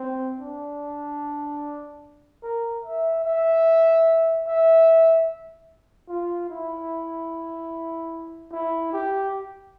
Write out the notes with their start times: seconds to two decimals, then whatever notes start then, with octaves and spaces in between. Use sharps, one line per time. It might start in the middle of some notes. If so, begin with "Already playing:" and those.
Already playing: C4
0.40 D4
2.43 A#4
2.85 E5
3.25 E5
4.47 E5
6.09 F4
6.50 E4
8.52 E4
8.93 G4